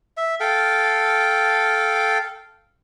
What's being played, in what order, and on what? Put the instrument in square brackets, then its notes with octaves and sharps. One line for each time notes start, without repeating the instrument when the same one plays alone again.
[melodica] E5
A4 F5 G5